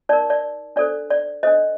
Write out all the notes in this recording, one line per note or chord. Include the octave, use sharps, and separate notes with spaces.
D#4 A#4 D5
D5
D4 A4 C5 D5
D5
D4 A4 C5 D#5